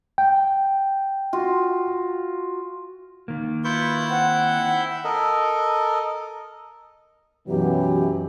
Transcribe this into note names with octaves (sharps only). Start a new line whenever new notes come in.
G5
F4 F#4
D#3 A#3
E4 F4 B4 C#6 G6
C4 F#5
A4 A#4 D#5
F#2 B2 E3 F#3 G4